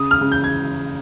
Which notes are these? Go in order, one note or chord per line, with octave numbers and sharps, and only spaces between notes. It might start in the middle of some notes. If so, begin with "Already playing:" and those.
Already playing: C#3 D#6
F6
C#3
G6
G#6